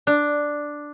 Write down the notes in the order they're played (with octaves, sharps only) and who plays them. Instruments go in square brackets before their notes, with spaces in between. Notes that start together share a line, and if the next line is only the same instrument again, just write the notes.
[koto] D4